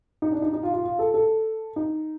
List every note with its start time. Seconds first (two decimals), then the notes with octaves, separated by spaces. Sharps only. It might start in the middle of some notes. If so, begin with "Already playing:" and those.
0.22 D#4
0.32 D4
0.42 D#4
0.53 D#4
0.63 F4
0.73 F4
0.84 F4
0.99 A4
1.14 A4
1.76 D#4